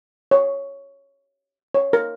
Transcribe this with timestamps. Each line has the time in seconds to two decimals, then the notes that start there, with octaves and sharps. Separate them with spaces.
0.31 C#5
1.74 C#5
1.93 A#4